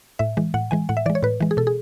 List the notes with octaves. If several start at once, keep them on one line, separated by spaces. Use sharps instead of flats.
A2 E5
E3 G#3
A2 F#5
E3 G#3 G#5
A2 F#5
E5
E3 G#3 D5
C#5
A2 B4
E3 G#3
G#4
B2 A4
G#4